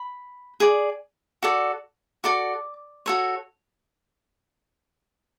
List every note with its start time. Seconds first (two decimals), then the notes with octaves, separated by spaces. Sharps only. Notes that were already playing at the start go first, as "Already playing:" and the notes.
Already playing: B5
0.60 G#4 D5
1.43 F#4 A4 D5
2.24 F#4 A4 D5 D6
3.06 F#4 A4 C#5